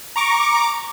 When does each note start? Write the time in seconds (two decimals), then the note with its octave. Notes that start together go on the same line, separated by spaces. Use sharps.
0.16 A#5 C#6 D6